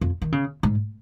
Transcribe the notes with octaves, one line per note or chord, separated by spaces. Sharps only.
F2
D#3
C#3
G#2